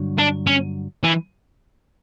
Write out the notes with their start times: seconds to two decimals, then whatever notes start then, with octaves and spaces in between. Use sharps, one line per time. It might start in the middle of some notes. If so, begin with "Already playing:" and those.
Already playing: G2 D3 F#3
0.18 D4
0.47 C#4
1.04 E3